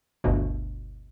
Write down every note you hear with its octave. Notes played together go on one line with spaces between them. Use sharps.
G1 D2 G2 B2